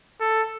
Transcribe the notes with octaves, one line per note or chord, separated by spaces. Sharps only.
A4